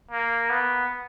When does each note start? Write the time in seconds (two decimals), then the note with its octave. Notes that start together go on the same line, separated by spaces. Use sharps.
0.11 A#3
0.50 B3